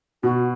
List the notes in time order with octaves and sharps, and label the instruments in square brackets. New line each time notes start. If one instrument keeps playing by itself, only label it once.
[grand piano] B2 [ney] F#4